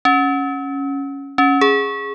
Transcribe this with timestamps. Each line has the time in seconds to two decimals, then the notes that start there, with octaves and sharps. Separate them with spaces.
0.05 C#4
1.38 C#4
1.61 G#4